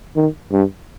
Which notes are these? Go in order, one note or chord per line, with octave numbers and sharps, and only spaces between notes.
D#3
G2